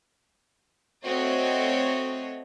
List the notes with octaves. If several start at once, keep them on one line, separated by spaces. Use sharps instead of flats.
A3 C4 F#4 C#5 D#5